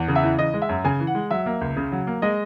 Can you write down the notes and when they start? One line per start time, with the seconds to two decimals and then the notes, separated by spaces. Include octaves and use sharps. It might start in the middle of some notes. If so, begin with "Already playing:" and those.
Already playing: E2
0.08 C#3
0.16 E5
0.23 E3
0.39 E3 D#5
0.54 G#3
0.62 E5
0.69 F#2
0.84 C#3 G#5
1.00 E3
1.07 F#5
1.15 G#3
1.31 F#3 E5
1.46 A#3
1.61 C#2
1.76 C#3
1.92 F#3
2.07 A#3
2.22 G#3 D#5